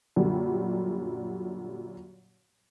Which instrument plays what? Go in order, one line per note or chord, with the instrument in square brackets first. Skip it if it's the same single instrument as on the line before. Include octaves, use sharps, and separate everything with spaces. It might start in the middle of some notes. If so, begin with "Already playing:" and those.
[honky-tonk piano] F#2 A#2 D3 G3